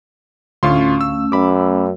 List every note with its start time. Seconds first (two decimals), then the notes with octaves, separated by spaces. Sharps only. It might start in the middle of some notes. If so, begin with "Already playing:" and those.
0.63 D2 A2 A3 C#4 F4 F5 C6 C#6
1.01 E6
1.32 F#2 B5 D6